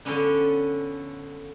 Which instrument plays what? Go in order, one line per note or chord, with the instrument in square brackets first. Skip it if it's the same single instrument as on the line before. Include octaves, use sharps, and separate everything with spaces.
[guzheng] D3 F3 B3 C#4 D4